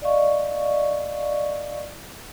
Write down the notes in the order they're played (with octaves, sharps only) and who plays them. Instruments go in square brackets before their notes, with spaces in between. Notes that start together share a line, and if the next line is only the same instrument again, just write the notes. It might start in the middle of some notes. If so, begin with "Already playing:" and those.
[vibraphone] D5 D#5 F5 C#6